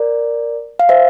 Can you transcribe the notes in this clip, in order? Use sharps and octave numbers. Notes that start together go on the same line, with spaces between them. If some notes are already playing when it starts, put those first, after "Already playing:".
Already playing: A#4 D5
F5
C5 E5